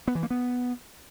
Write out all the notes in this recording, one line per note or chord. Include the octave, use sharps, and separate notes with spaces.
B3
E3
A#3
B3